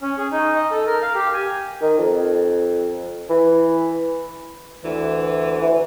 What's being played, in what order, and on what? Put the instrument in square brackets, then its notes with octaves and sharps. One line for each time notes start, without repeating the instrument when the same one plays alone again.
[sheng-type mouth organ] C#4
G#4
D#4
D#5
A4
A#4
F5
G4
G#5
[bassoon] D#3
F2
E3
[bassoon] D2 [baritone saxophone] E3
[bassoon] E3